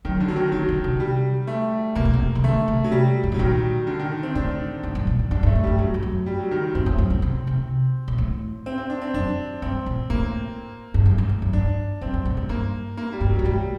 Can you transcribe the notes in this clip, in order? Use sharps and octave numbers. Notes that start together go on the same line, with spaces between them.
D#3 F#3
D3
F#3
D#3
D#3 F#3
D3
C3
G3
A3
C3 A#3
A#2
C3
D#3
D3 A3
C3
F#3
G3
G2
A2 F#3
A#2 D#3
D3
D#3
C4
A2 D4
G2
G2
A#2
G2
G2 D4
G2
A3
A2
G2 G3
F#2 F#3
G2
F#2
G3
F#3
D#3
G2 C4
A2
F#2
G2
C3
C3
A#2
A2
C4
C4
D4
C4
F#2 D4
G2 C4
A#2
A2 A#3
G2
F#2
G2
A2
F#2
G2 D4
F#2 C4
F#2
A2
G2
G2 A#3
A#3
G3
G2
F#3
G2
A2 G3